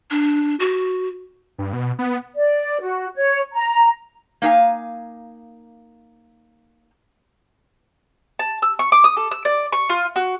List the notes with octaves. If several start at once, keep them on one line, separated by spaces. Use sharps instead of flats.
D4
F#4
G2
B2
B3
D5
F#4
C#5
A#5
A#3 D#4 E5 F5 G#5
A5
E6
C#6
D6
D#6
A4
E6
D5
C#6
F4
F#4